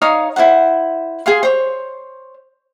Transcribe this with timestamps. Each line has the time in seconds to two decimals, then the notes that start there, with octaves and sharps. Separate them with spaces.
0.02 D#4 C#5 F5 D#6
0.36 E4 F4 C5 F#5
1.26 G#4 F5 C6
1.43 C5 C#5